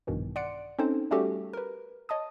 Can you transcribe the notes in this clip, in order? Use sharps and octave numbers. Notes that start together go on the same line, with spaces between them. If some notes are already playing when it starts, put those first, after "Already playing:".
A#1 G2 B2 D#3 E3
D5 F#5 C6 C#7 D7
C4 C#4 D#4 A4 C5
G3 A3 C#4 F#4 G4 A4
A#4 B4
C#5 D#5 A5 D#6